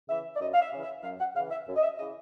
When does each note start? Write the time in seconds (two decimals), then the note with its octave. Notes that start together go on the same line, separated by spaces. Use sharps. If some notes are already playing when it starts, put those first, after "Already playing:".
0.09 C#3 E3 E5
0.36 D5
0.40 F#2 D#5
0.53 F5
0.61 E5
0.73 C#3 E3
0.83 E5
1.03 F#2 F5
1.20 F#5
1.35 C#3 E3 F5
1.51 E5
1.68 F#2
1.76 D#5
1.83 E5
1.98 C#3 D#5
2.02 E3